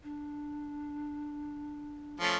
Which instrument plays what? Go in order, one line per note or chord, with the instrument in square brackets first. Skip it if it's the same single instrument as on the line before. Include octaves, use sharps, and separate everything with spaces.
[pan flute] D4
[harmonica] F3 A3 C#4